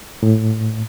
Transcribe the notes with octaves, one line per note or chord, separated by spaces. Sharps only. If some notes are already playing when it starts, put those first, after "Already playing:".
A2